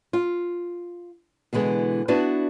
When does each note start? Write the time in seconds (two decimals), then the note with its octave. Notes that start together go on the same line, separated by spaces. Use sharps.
0.13 F4
1.53 B2 D3 E3 G#3 B3
2.08 B3 D4 E4 F#4 B4 D5